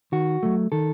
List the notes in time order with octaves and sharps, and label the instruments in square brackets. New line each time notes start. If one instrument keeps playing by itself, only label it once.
[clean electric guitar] D#3 F#4
F#3 A3
D#3 A4